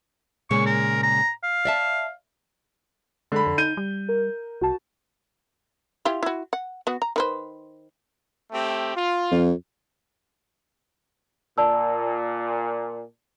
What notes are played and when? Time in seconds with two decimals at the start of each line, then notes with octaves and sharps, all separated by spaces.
0.51 A#2 C#3 G#3 C#6
0.66 A#4
1.03 A#5
1.44 F5
1.65 D5 E5 A5
3.32 D3 G#3 B5
3.47 F2
3.58 D#4 G6 D#7
3.77 G3
4.09 A#4
4.61 C2 F#4 A5
6.05 E4 F4 G4
6.23 E4 F#4
6.53 F#5
6.87 B3 F#4
7.02 A#5
7.16 D#3 B4 C5
8.52 A3 C4 G4
8.95 F4
9.32 F2
11.58 A#2 D5 A5 E6